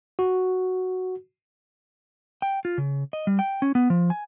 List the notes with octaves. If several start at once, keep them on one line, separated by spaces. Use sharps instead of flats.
F#4
G5
F4
C#3
D#5
G3
G5
C#4
B3
F3
G#5